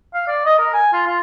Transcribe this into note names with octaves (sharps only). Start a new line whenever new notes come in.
F5
D5
D#5
A#4
G#5
F4
F4